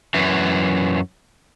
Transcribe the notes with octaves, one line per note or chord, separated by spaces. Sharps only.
F#2 E3